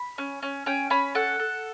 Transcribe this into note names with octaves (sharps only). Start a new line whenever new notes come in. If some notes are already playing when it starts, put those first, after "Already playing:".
Already playing: B5
C#4
C#4
C#4 G5
C#4 B5
A4 F#5
A4